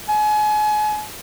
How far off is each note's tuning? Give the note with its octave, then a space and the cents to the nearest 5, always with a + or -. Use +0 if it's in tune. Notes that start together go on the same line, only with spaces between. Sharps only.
G#5 +35